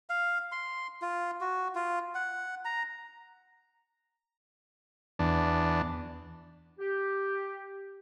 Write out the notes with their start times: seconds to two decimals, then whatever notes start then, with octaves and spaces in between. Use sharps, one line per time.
0.09 F5
0.52 C6
1.02 F4
1.41 F#4
1.75 F4
2.15 F#5
2.65 A#5
5.19 E2 D4
6.79 G4